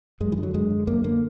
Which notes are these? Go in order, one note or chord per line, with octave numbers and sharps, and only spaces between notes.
F#2 G#3
E3
D3
F#3
F#2 G#3
D3
F#2 A#3
D3 A#3